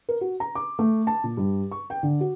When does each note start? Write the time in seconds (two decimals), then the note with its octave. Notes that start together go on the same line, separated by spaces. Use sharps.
0.09 A#4
0.21 F#4
0.40 A#5
0.55 D6
0.79 A3
1.07 A5
1.24 A#2
1.37 G2
1.71 C#6
1.90 G5
2.03 D3
2.21 F#4